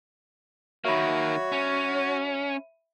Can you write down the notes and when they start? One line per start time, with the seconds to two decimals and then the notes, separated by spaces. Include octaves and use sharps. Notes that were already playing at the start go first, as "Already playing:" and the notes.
0.85 D#3 F#3 A#3 F#4 C#5 E5 B5
1.52 C#4